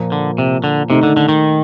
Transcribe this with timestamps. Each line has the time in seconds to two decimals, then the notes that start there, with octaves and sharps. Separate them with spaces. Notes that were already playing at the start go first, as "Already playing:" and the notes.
Already playing: A#2 F3 A#3
0.12 D3
0.38 C3
0.64 D3
0.90 C3 D#3 A3 D#4
1.03 D3
1.17 D3
1.29 D#3